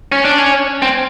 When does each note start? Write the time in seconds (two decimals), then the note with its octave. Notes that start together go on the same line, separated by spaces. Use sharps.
0.12 C#4
0.25 D4
0.38 C#4
0.82 C4